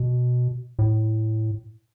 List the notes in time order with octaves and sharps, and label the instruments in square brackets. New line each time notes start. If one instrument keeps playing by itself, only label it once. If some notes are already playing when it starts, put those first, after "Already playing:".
Already playing: [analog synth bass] B2
A2